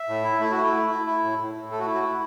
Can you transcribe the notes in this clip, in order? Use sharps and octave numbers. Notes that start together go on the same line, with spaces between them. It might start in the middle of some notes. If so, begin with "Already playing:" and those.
Already playing: E5
A2
E4
A3 E4
F#4
A3
E4
A3
E4
E4
A2
A2
A2
A3 A4
F#4
E4
F#4
E4